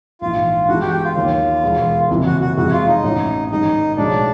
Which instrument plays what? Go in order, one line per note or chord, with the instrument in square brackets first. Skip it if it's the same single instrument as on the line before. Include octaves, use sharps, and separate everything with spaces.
[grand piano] A#1 G#2 E3 [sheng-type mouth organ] F4
[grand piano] G2 E3 G#3 B3 [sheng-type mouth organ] F#4
[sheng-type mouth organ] G4
F#4
G4
F4
[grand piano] D#2 D#3 F#3
E1 E2 B2 G#3 B3
F#1 F2 C3 E3
[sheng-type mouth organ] F#4
F#4
[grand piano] F2 C3 E3 G#3 [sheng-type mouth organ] F#4
[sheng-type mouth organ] F4
D#4
[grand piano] A1 A2 E3
[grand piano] G#2 D#3 G3 [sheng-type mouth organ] D#4
[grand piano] B1 A2 F3 G#3 C#4 [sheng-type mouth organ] D4